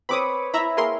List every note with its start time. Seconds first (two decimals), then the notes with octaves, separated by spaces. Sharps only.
0.09 C4 B4 C#5 B5 D6 D#6
0.54 E4 E5 A#5 B5
0.77 A#3 G#4 A#4 C6